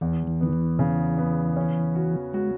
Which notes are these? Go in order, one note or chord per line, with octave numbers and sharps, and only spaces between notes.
E2 E3
E3
D#3 B3
E3
C#3
B3
C#4
F#4
G#3 F#4